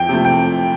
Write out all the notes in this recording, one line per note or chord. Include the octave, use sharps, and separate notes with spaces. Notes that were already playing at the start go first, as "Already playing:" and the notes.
Already playing: F2 G5
C3 F3 A3
G5